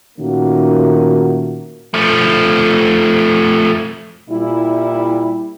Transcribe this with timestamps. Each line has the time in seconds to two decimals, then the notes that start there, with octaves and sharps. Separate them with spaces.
0.18 A#2 D#3 A3 A#3 C#4 F#4
1.94 F3 A3
4.30 A#2 G3 E4